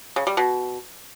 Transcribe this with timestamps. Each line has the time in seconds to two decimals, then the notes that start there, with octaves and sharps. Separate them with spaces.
0.16 C#3
0.27 G3
0.37 B2